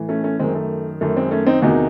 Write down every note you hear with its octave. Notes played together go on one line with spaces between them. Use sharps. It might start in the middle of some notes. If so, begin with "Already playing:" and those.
Already playing: A2 E3
A3 C#4
A3 C#4
F#2 D#3 G#3 C4
A3
F#2 D#3 A3
G#3 C4
A3 C#4
C4 D#4
E2 C3 D#3 D#4 F#4